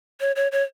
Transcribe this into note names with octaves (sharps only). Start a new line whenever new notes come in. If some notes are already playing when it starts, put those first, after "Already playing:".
C#5
C#5
C#5